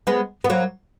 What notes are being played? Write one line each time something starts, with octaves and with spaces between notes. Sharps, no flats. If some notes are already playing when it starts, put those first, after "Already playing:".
G#3 B3
B3
F#3 A#3